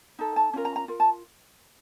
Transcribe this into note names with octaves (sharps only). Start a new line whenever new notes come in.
D#4 A4
A5
C#4 F4 A#4
A#5
A#5
F4 A#4
A5